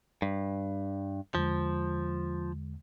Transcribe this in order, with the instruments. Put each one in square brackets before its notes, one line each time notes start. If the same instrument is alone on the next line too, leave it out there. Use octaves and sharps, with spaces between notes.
[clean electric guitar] G2
[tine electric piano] E2 D3 G#3 [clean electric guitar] F3